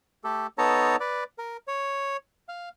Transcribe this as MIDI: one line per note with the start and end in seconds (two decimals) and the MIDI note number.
0.24 0.47 57
0.24 0.47 67
0.24 0.47 69
0.58 0.96 59
0.58 0.96 63
0.58 0.96 69
0.58 0.96 73
0.58 0.96 81
0.58 0.96 82
1.00 1.24 71
1.00 1.24 74
1.38 1.57 70
1.68 2.17 73
2.49 2.69 77